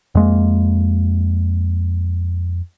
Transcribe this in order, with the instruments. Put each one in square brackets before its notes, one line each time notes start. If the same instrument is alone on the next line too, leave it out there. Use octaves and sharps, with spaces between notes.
[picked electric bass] F2 G#3 A#3